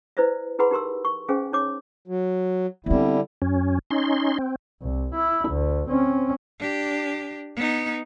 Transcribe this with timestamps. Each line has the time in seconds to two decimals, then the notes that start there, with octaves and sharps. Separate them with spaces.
0.17 E4 B4 C5 D5 E5
0.59 E4 G#4 B4 F#5 B5 C6
0.71 D#4 G4 A#4 C6 E6
1.05 C#6
1.28 C#4 G#4 C5 F5 G5 G#5
1.52 D#4 C#5 D6
2.08 F#3
2.86 D3 G3 B3 C4 E4
3.42 F#2 C#4
3.90 C#4 D#4 C6
4.38 C4
4.82 C2
5.15 E4
5.49 D2
5.89 C4 C#4
6.59 D4 G4
7.56 B3 D#4